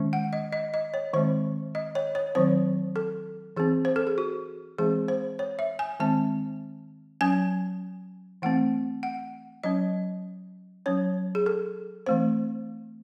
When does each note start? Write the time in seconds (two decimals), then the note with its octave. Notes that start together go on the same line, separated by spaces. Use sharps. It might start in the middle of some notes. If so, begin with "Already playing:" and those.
Already playing: D#3 G#3 C#4
0.13 F#5
0.33 D#5
0.52 D#5
0.74 D#5
0.94 C#5
1.13 D#3 G#3 C4 C5
1.75 D#5
1.95 C#5
2.15 C#5
2.35 D#3 F#3 C4 C5
2.96 A4
3.57 E3 C4 G#4
3.85 C5
3.96 A4
4.07 G#4
4.18 F#4
4.78 E3 G#3 C4 G#4
5.08 C5
5.39 C#5
5.59 E5
5.79 G#5
6.00 D#3 G#3 C4 A5
7.21 F#3 C#4 G#5
8.42 E3 A3 C4 F#5
9.03 F#5
9.64 F#3 C#4 D#5
10.86 F#3 C#4 C#5
11.35 G#4
11.46 A4
12.06 E3 A3 C4 C5